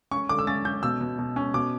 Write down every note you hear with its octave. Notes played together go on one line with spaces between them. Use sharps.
C#4 C#6
D3 D6
E6
C#4 A6
C#4 G6
B2 E6
B2
B2
C#4
B2 D6